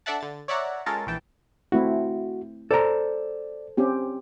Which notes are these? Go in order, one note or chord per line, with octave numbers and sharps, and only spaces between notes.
D4 A4 D5 E5 F#5 A5
D3 A6
C#5 D5 E5 F#5 A#5
G#3 C#4 F4 A4 A#4 A6
A#1 E3 G5 A5
A3 C4 E4 F#4
A4 C5 D5 A#5
C4 C#4 G4